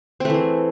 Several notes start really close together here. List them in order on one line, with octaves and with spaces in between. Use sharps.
C4 A3 E3 G#4